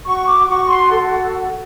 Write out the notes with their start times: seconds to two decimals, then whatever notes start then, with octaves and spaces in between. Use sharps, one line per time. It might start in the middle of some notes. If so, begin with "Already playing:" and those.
0.05 F#4 C#6
0.27 D6
0.48 F#4 C#6
0.69 C6
0.91 A4